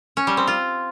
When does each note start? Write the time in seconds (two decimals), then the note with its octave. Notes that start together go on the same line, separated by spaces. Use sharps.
0.17 C#4
0.27 G3
0.37 C4
0.47 F4